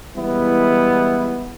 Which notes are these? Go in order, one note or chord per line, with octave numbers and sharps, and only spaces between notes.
E3 G3 G#3 B3 E4